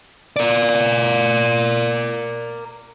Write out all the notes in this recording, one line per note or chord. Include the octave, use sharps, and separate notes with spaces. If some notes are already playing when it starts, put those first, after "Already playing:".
A#4 D5